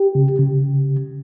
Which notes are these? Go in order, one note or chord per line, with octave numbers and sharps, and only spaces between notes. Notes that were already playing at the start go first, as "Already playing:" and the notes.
Already playing: G4
C#3
C#3